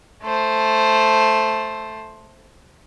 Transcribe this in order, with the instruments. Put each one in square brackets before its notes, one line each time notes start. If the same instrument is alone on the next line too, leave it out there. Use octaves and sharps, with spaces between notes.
[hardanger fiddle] A3 C5